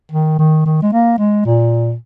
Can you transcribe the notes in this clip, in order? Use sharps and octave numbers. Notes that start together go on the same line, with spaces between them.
D#3
D#3
D#3
G#3
A#3
G#3
A#2